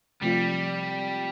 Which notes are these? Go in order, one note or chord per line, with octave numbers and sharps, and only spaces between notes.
C3 F3 G3 A3 C4 F4